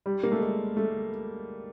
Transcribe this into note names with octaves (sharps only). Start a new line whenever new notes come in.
G3
A#3
A3
G#3
A3